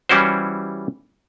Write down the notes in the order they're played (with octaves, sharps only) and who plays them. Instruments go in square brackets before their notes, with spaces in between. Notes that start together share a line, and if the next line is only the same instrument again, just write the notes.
[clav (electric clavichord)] E3 G3 C#4 E4 F#4 C5